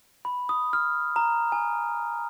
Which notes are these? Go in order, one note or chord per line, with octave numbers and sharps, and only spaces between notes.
B5
D#6
F6
A#5
G#5